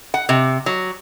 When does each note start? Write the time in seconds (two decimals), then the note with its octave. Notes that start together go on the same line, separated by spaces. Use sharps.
0.14 F#5
0.29 C3
0.66 F#3